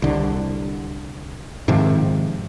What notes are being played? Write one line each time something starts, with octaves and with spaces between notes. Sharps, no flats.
C2 D3
G#2 C3 D#3 F3